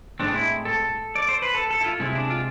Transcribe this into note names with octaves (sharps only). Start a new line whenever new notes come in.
A2 G#3 C4 D4
E4
A4
D5
C5
B4
A4
A4
E4
F4
C3 G#3 C4 E4
D4
F4